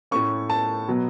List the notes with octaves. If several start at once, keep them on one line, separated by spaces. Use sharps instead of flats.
A2 A3 C#4 C#6
A5
B2 F#3 B3